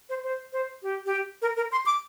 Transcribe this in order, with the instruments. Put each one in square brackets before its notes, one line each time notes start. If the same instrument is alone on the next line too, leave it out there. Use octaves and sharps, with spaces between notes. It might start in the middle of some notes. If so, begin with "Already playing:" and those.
[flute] C5
C5
C5
G4
G4
A#4
A#4
C6
D6